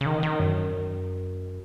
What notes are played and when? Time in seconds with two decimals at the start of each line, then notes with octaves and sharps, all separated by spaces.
0.01 C#3
0.06 D#3
0.23 D#3
0.40 F#2